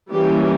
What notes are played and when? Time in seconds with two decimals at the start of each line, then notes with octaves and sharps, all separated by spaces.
0.11 E3 G3 A#3 C#4 G4